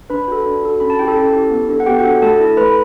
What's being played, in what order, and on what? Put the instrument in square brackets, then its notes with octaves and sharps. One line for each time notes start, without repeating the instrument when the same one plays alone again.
[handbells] D4 B4 B5
F#4 A4
D4
F#4 A4
C#4 B5
A5
E4 G4 G5
A4 A5
C#4
E4 G4
B3
D4 A4
F#5
B3 G4 G5
F#4 F#5
D4 A4
A3 A4 A5
E4 A4
A3 B4 B5